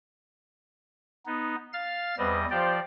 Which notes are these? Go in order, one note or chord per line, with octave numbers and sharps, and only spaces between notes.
B3 D#4
F5 F6 A6
E2 G3 B3 C4 B4 D#5
F3 F4 G4 C5 D5